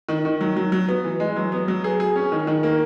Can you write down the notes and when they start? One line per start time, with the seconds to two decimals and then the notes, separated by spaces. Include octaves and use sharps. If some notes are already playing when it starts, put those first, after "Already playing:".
0.09 D#3
0.25 D#3
0.41 F#3
0.56 F#3
0.72 F#3
0.89 B3
1.04 E3
1.20 G#3
1.36 F#3
1.52 B3
1.68 F#3
1.84 G#4
2.00 G#4
2.16 C#4
2.32 D#3
2.47 D#3
2.63 A#3